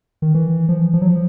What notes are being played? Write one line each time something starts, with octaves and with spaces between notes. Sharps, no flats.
D#3
E3
F3
F3
F#3
F3